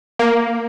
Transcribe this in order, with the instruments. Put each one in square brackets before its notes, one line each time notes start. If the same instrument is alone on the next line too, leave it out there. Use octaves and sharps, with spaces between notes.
[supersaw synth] A#3